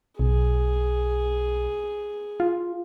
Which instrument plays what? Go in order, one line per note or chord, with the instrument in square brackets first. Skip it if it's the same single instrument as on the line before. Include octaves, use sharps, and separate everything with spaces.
[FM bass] B1 [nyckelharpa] G#4
[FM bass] F4